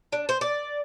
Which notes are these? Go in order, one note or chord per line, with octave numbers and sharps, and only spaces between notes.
D4
C5
D5